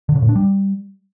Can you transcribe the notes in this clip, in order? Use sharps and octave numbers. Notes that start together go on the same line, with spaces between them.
D3
C#3
A2
D4
G3